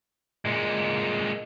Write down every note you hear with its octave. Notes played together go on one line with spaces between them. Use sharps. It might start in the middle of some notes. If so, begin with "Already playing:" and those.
A#2 G#3